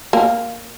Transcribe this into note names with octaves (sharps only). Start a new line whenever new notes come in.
A#3